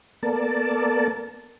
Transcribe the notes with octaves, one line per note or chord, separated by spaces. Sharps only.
A#3 B3 A4 A#4 D5 A5